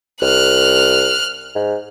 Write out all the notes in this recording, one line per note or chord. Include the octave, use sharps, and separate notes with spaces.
C2 F6 F#6
G#2